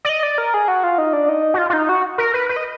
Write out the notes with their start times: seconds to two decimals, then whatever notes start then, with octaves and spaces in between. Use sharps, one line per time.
0.05 D5
0.09 D#5
0.23 D5
0.38 A#4
0.54 G#4
0.68 F#4
0.84 F4
0.98 D#4
1.13 D4
1.29 D#4
1.54 F#4
1.58 F4
1.70 F4
1.73 D#4
1.89 F#4
2.18 A#4
2.34 B4
2.49 B4
2.56 D#5